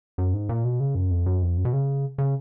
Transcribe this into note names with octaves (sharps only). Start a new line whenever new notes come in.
F#2
G#2
A#2
B2
C#3
F#2
F2
F#2
F2
F#2
B2
C#3
C#3